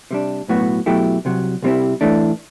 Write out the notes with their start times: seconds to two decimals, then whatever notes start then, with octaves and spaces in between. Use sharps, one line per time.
0.11 C3 G3 D4
0.48 B1 A2 F#3 B3 F#4
0.86 B2 F#3 A3 E4 G4
1.25 C2 C3 F#3
1.62 C2 C3 G3 C4 E4
2.01 A2 E3 A3 D4